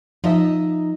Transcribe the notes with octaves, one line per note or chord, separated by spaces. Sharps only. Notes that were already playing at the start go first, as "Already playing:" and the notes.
F3 D#4 D#5 E5